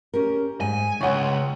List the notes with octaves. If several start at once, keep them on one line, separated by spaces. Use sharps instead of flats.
C#4 G4 A#4
G#2 G#5
C#2 C#5 D5 F#5 G5